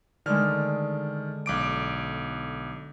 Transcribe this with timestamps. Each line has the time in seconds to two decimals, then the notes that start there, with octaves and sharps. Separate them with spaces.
0.26 D3 D#3 G#3 F6
1.46 B1 D6 D7